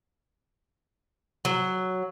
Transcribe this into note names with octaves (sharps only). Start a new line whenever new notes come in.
F#3